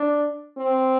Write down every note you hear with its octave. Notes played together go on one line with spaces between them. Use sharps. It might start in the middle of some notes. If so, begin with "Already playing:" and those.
Already playing: D4
C4